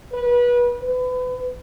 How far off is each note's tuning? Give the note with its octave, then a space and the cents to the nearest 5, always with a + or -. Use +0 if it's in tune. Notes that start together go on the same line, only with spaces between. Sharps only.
B4 -25
B4 +30